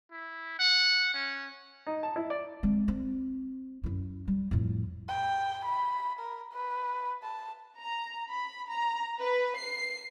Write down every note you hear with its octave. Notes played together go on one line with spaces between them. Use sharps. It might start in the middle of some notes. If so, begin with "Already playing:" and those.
E4
F#5
C#4
D#4
A5
E4
D5
G#3 C4
C4
F#2 E4
G3
F2 A2
G5
B5
A#4
B4
A5
A#5
B5
A#5
B4
C7